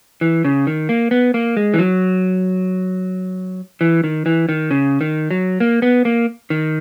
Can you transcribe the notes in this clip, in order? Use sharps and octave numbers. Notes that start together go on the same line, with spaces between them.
E3
C#3
D#3
A#3
B3
A#3
G#3
E3
F#3
E3
D#3
E3
D#3
C#3
D#3
F#3
A#3
B3
A#3
D#3